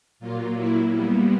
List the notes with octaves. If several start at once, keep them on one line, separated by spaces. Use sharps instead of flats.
A#2 F#3 A#3 F4
E4
A#2 G3 A#3 B3